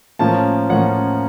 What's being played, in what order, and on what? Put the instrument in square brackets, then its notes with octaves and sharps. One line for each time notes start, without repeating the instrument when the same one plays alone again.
[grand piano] A2 F3 A#3 C#4 A5
A2 F3 A#3 C#4 F#5